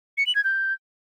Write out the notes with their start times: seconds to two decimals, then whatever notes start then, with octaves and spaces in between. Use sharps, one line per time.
0.18 C#7
0.26 F#7
0.35 G#6
0.44 G6